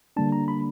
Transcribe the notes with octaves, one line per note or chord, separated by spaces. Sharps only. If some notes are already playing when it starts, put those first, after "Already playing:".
D3 G3 A#3 D4 A5
A#5
B5